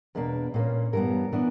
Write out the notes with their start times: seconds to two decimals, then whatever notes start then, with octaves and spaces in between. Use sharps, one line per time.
0.15 E2 B2 A#3 D4 B4
0.54 A#2 A#3 C#4
0.93 G2 E3 G3 B3 A#4
1.33 E3 B3 D4